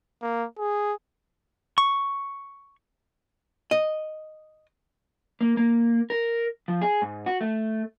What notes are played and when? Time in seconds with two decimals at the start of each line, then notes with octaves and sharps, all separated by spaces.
0.22 A#3
0.59 G#4
1.78 C#6
3.71 D#5
5.41 A#3
5.57 A#3
6.10 A#4
6.68 F3
6.82 G#4
7.02 G#2
7.26 F#4
7.41 A3